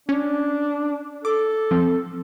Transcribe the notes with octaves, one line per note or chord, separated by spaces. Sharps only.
C#4 D4
A4 D6
F3 C4